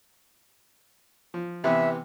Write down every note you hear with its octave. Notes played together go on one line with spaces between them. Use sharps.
F3
C3 E3 B3 E5